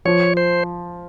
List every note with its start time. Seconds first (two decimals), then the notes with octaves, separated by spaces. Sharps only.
0.05 F3 C#5
0.37 C5